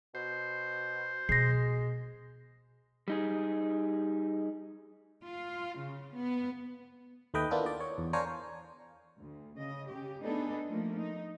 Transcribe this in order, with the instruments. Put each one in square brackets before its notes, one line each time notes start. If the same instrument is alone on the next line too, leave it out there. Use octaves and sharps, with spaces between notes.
[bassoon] B2 [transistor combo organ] C5
[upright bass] B2 [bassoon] G#3 [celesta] A#6 C7
[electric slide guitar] G3 D#4 G#4
[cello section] F4
C#3
B3
[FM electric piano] D#2 A3 B4 D#5 G5
A#3 B3 D4 E4 F4 A4
D5
C#5
E2
D4 A#4 C5 C#5 F5 G#5
[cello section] D2
C#3 D#5
C#3 G4
A3 B3 D4 D#4 G#4 A4
F3 A3 A#3
D#4